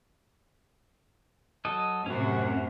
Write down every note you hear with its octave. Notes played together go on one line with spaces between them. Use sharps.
F#3 A4 D#5
F#2 A2 C3 C#4 F#4